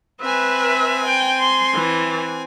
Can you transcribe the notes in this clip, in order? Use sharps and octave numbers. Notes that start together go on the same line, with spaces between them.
C4 B4 E5 G#5
G5
C6
E3